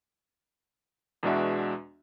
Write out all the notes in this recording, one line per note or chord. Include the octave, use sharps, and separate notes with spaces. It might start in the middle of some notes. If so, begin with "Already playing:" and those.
E2 B2 G#3 D4 F#4 E5